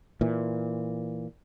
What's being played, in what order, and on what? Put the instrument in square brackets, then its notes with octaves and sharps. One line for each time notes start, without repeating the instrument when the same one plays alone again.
[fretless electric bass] A#2 E3